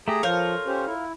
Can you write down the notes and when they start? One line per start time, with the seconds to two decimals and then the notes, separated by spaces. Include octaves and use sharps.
0.08 A3 G4 G#4 A#5
0.23 F3 F4 A4 A#4 C#5 G6
0.67 C#4 G4 C5
0.86 E4